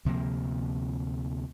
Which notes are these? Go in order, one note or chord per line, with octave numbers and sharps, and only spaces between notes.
D2 C3 F3 A#3